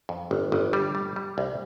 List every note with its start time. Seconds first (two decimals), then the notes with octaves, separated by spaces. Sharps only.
0.09 F2
0.31 G1
0.52 G1
0.73 G3
0.95 G3
1.16 G3
1.38 C2